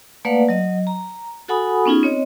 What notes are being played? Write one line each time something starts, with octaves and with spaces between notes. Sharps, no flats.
A3 A#3 B4 D5 F5 F#5
F#3 D#5
A#5
F#4 A4 F#5 G#5 B5 D#6
B3 C#4 D#4 F4 G#4
C4 C#5 D#5